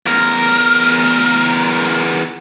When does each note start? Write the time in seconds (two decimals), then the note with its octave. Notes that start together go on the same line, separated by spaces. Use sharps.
0.06 E2 A#4